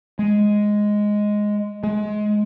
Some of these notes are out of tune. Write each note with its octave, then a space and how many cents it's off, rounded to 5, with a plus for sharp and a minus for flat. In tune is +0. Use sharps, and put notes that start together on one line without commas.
G#3 +0
G#3 +25